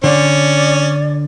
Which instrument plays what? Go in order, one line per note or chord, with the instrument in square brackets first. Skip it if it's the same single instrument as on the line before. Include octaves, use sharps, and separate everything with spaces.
[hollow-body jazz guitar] D3 [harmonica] C#4 [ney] D5